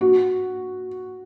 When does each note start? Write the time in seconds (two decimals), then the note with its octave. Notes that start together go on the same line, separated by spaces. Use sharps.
0.01 F#4